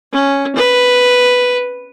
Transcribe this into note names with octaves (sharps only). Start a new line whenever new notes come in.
C#4
B4